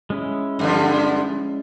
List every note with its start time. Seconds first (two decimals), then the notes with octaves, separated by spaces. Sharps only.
0.10 G#3 C#4 E4
0.59 G2 D3 F3